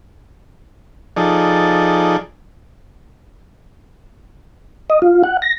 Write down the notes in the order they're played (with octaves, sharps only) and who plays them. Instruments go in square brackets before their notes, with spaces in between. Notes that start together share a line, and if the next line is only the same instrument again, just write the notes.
[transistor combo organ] F3 D#4 G#4 A4 D5
[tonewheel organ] D#5
F4
F#5
A#6